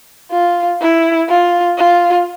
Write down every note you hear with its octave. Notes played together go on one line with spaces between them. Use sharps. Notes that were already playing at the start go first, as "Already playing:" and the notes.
F4
E4
F4
F4